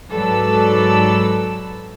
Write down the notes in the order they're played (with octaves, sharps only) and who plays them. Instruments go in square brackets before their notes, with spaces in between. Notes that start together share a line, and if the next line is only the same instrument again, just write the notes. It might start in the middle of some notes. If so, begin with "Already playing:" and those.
[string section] G#2 F#3 A4 B4 D5 E6